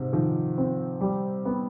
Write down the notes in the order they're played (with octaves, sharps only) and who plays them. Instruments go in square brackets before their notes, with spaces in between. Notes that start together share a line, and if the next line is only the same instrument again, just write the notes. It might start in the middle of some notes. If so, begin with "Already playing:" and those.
Already playing: [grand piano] G#2 C3
[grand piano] D#3 [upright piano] F3
[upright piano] C4
G3
B3